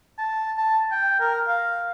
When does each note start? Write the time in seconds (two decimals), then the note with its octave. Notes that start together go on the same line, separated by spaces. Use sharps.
0.19 A5
0.58 A5
0.92 G5
1.20 A#4
1.48 F5